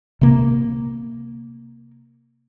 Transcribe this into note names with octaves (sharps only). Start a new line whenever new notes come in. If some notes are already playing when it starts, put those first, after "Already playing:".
C3 A#3